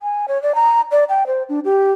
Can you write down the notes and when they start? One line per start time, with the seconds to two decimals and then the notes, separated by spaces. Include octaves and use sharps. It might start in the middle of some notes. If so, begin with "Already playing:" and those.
0.01 G#5
0.28 C#5
0.42 D5
0.55 A#5
0.91 D5
1.09 G5
1.27 C5
1.49 D4
1.65 G4